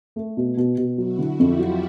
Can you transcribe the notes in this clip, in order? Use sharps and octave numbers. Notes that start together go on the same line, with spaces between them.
A3
B2
B2
B2
F#3 E4 F#4
D3
F2 F4 G4
F#3